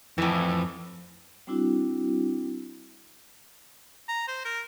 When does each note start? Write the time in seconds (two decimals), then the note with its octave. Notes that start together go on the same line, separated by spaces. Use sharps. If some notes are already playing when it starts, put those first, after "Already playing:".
0.18 F2 A2 E3
1.47 G3 C4 D4 E4 F#4
4.08 A#5
4.28 C5
4.45 A#4